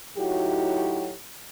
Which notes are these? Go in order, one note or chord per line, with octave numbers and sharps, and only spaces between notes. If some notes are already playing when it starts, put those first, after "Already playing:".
A2 F#3 D#4 E4 F#4 G4